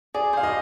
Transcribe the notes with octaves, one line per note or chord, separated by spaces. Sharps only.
G#4 D5
C5 F5
D#5